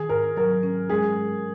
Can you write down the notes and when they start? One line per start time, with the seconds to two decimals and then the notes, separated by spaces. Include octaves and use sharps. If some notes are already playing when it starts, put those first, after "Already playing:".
Already playing: D#3 G#4
0.09 G#2 A#4
0.37 F#3 A#4
0.63 C#4
0.89 G#3 G#4
1.17 G#2